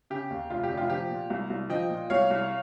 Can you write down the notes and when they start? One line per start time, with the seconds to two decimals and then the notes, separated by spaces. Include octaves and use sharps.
0.10 C#3 G4
0.30 D#2
0.50 F1 F4
0.64 G4
0.70 F1
0.77 F4
0.90 F3 G4
1.10 A#2
1.30 C2
1.50 C2
1.70 F3 D#5 G5
1.90 A#2
2.10 C2 C#5 F5
2.30 C2